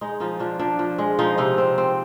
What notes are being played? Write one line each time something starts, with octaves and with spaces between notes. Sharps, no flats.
G#3 D#4
F3 D#4
F3 D4
F3 D4
F3
G#3
F3 D#4
C3 D#4
C4
C4